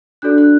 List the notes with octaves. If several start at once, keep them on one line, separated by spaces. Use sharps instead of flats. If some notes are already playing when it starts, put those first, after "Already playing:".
D4 F#4 A4 D5 F#6
F#6